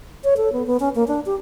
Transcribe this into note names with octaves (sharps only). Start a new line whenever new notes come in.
C#5
A4
B3
B3
C#4
A#3
D4
G4